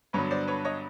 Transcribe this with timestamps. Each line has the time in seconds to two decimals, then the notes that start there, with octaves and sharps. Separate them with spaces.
0.13 G2 D3 F#3 B3 B4 C#5
0.31 C5 D5
0.48 B4 C#5
0.65 C#5 D#5